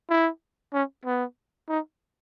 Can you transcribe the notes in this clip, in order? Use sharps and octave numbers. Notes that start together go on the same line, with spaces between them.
E4
C#4
B3
D#4